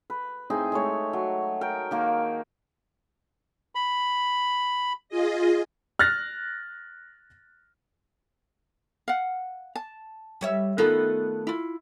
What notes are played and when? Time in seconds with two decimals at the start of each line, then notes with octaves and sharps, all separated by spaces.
0.10 B4
0.50 A2 C4 D#4 G#4
0.72 G#3 A3 C#5
1.13 F#3
1.61 A#4 G5
1.91 D#3 A#3
3.75 B5
5.09 F4 G#4 D#5
5.99 F6 F#6 A6 A#6
9.08 F5 F#5
9.75 A5
10.41 G3 C#5 E5
10.78 D#3 A3 B3 D#4 F4 A4
11.47 E4 F4